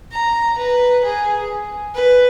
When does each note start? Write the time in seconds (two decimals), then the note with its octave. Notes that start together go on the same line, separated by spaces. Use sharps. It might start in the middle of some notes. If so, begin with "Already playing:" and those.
0.12 A#5
0.58 B4
1.04 G#4
1.95 B4